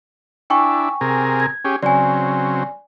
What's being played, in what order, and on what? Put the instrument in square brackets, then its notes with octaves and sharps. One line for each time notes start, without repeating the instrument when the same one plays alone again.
[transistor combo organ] D4 E4 [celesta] G5 G#5 C#6
[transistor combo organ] C3 G#4 A#4
[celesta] G#6
[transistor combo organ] C#4 G4 G#4
[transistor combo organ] C#3 F#3 C4 [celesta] D5 G#5